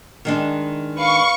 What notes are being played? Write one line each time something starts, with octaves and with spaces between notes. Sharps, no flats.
D#3 G#3 D4
B4 F5 C#6